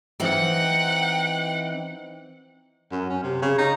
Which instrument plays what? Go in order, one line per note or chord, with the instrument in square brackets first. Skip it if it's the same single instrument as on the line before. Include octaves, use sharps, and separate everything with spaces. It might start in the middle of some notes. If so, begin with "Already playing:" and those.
[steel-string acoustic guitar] E3 C4 D#4 [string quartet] F#5 G5 F#6
[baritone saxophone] F#2
C#4
C3
C#3
D#4